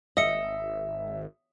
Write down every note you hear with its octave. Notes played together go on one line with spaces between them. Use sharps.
G#1 D#5 E5 D#6 C#7